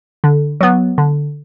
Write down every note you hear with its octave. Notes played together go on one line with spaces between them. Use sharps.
D3
F#3 B3
D3